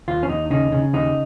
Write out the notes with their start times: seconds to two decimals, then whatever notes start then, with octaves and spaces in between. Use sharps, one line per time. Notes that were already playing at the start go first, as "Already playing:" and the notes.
0.08 D#2 F4
0.23 C#4
0.29 D#2 D#4
0.50 C#3 D#4
0.72 C#3
0.93 D#2 D#4